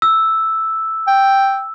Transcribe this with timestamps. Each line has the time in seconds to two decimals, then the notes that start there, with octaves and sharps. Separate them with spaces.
0.02 E6
1.07 G5